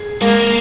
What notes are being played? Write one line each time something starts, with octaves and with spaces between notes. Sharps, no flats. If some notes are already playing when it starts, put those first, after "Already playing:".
Already playing: G#4
G#3 A#3